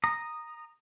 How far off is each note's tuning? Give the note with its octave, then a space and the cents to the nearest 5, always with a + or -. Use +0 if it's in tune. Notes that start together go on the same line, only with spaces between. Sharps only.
A#5 +0 D#6 -10